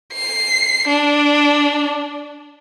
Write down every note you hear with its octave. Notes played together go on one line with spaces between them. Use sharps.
C7
D4